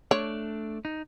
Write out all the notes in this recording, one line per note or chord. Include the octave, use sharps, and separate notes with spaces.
A3 D4 C#5 D5
D#4